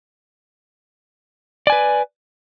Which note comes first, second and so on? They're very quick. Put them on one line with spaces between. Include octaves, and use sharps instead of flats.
D5 G#5 B4